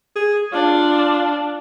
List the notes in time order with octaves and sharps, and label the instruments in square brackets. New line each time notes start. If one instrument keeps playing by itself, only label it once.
[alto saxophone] G#4
[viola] D4 [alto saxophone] F4